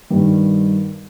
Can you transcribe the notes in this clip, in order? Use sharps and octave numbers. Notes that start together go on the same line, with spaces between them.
G2 D#3 G3